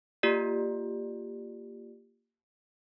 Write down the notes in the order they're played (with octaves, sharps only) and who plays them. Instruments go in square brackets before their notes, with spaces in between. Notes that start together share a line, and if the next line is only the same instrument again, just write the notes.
[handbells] A#3 F4 G4 D5